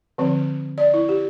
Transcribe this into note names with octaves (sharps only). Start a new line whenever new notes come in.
D3 F3 C4
D5
E4
G4